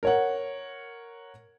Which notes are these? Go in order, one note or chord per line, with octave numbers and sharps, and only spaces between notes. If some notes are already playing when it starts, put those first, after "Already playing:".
A#4 C#5 F#5